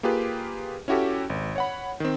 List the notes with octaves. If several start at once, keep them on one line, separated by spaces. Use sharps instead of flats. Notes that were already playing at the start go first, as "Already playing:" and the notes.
A#3 F4 G4 G#4 B4
C#4 E4 F#4 G4 A4
G#1
C#5 F#5 B5
D#3 C4